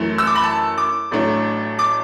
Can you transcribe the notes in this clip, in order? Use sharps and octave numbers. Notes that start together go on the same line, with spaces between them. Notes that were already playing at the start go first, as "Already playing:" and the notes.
Already playing: F#2 E3 A3
E6
D6
B5
A5
D6
A1 A2 F#3 A3 D4
D6